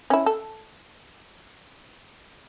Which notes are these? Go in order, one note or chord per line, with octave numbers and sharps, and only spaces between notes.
C#4 E4
A4